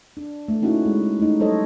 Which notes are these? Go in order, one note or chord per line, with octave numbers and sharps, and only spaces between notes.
D4
A3
A#3 C#4 D#4 E4 F#4
G#3
A3 D#4
F#3 G3 A4 C5 C#5 D#5